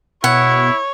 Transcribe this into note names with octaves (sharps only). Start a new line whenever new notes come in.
B2 E4 C#5 F#5